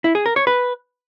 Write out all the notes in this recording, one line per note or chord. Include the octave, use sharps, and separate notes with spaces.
E4
G#4
A#4
C#5
B4